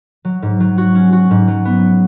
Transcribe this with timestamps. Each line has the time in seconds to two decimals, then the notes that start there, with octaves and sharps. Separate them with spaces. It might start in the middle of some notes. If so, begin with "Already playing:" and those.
0.25 F#3
0.42 G#2
0.60 F#3
0.78 F#4
0.95 C#4
1.13 F#4
1.31 G#2
1.48 F#3
1.65 B3